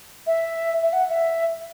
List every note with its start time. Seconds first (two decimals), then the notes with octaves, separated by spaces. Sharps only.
0.27 E5
0.83 E5
0.93 F#5
1.09 E5